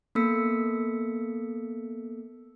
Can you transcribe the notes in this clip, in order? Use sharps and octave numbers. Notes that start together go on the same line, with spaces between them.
A#3 B3 A4 E6 B6 C#7